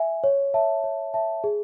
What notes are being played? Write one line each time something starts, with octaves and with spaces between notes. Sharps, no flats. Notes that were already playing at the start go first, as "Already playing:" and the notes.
Already playing: E5 G#5
C#5
E5 A5
C#5
E5 A5
G#4